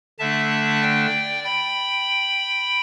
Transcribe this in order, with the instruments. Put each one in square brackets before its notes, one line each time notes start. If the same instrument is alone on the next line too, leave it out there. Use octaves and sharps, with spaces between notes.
[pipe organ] D3 A3 D4 E5 A5
D5 G5
G5 B5